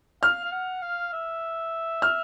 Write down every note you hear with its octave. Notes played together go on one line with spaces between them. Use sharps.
F5 F6
F5
F#5
F5
E5
F6